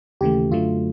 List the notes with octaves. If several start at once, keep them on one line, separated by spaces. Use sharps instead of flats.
D#2 C#3 E3 A3 G4
F#2 D3 F#3 A3 F4